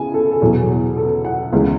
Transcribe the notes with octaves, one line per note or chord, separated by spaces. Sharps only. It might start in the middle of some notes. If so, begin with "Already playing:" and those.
Already playing: C#3 B3 G#5
A4
A4
E2 B2 F#3 G#4
A4
F#5
C#2 C#3 E3